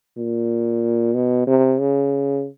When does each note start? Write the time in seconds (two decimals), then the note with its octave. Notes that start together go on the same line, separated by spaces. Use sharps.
0.17 A#2
1.15 B2
1.47 C3
1.80 C#3